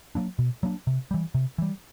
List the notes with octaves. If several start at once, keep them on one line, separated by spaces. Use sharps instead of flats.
F#3 A#3 D4
B2
F#3 A#3 D4
C3
E3 G3
C3
E3 G3